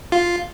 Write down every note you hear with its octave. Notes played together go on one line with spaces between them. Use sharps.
F4